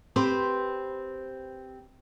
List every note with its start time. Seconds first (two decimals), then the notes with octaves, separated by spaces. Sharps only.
0.16 C4 G4 B4 C5